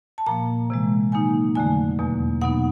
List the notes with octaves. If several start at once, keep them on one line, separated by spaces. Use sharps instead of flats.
A5
A#2 F3 A#3 A#5
C3 E3 G#3
D#3 F#3 A#3 D#4 G#5
F2 D3 F#3 A3 G#5
E2 B2 F#3 A#3
B2 F#3 B3 D#4 F#5